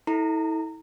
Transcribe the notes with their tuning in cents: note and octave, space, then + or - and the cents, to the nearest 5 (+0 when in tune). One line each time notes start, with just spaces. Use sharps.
E4 -35 A4 +0 A#5 -20